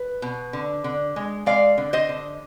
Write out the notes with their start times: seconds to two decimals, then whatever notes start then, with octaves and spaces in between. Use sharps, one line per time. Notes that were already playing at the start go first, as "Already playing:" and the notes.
Already playing: B4
0.22 B2
0.53 D3
0.84 D3
1.16 G#3
1.46 G#3 D5 F5
1.78 D3
1.93 C5 D#5
2.09 D3